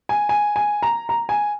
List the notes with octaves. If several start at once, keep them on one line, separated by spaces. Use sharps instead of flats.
G#5
G#5
G#5
A#5
A#5
G#5